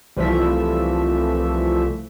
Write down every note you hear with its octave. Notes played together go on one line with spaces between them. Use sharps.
C2 E3 F3 A3 E5